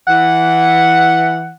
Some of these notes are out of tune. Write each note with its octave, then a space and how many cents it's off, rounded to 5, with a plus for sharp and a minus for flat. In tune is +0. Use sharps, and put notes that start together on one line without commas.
E3 +0 F#5 +0